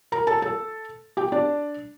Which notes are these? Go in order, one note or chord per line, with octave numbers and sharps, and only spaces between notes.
A#4 A#5
A4 A5
A4 A5
G4 G5
D4 D5